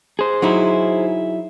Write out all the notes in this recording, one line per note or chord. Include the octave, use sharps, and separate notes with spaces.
G#4 C5
F#3 D#4 E4